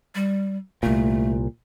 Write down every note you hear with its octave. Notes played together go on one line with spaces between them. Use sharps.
G3
C2 A#2 A3